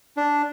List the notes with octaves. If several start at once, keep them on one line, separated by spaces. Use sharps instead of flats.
D4